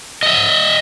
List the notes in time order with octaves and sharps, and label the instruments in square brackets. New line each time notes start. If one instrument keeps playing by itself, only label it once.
[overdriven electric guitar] D#5 E5